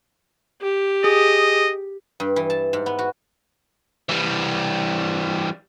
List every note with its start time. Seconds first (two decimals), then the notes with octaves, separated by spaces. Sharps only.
0.61 G4
1.04 G#4 D#5
2.20 G2
2.36 E3
2.50 A5
2.73 G#2
2.86 B3
2.99 F#4
4.09 E3 G3